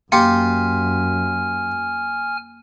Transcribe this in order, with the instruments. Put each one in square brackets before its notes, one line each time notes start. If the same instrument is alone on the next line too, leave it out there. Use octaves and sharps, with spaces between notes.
[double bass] F#2 [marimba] A#3 [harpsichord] F4 G4 [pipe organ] G#5 F6